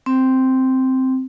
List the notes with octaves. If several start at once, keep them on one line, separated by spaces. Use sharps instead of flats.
C4